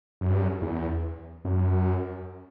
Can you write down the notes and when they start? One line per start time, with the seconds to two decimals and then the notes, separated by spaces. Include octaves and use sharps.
0.21 F#2
0.30 G2
0.41 F#2
0.62 E2
1.45 F#2